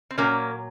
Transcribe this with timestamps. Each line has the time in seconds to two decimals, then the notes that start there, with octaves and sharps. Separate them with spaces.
0.11 C4
0.18 A#2 F#3 A#3 C#4